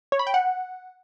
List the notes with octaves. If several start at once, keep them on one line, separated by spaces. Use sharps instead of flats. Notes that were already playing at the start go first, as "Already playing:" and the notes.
C#5
B5
G5
F#5